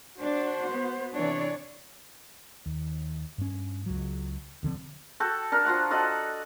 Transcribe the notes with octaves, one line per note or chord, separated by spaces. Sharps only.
D4 F#4 C5
B3
C3 E3 D4 C#5 D5
D#2
G2 C#4
C#2 F#3
D#1 D3 F3 C4
F#4 A4 G5
D4 A#4
F3 F4 F#4 F#5
F#4 A4 D5 D#5